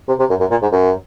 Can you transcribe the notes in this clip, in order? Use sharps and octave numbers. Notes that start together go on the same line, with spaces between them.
C3
C3
F#2
F#2
A#2
G#2
F#2